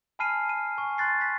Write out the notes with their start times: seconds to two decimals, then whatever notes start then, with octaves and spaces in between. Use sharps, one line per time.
0.19 G#5 A5 B5 F6 C7 D#7
0.49 D#7
0.78 G#5 C#6
0.98 C6 F#6 A6 C7
1.20 A6 B6